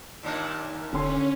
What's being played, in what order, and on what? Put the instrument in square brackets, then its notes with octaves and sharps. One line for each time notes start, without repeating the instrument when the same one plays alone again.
[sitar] D#2 A#2 D4
[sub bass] E1 [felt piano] D3 C6 [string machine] C#4